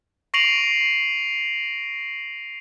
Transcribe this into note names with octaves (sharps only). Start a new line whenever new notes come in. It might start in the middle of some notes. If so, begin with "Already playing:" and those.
C#6 A#6 C7 D7 F7 F#7